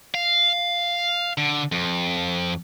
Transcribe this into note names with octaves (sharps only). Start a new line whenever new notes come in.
F5
D3
F2